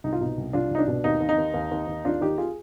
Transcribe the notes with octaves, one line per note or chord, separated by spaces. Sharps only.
C2 D#4
F4
B2 D#4
C2
C2 D4 F4
C2 D#4
D4
B2
D#2 D#4
D#2
D#4
D#2
D#2
D#2
D#2
D#2 D4 F4
D#2 D#4 G4
F4 G#4